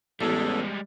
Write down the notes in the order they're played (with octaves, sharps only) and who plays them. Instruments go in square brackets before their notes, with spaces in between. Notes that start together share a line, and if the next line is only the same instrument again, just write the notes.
[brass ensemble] A1 [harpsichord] E2 [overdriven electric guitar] G3 G#3 [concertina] A4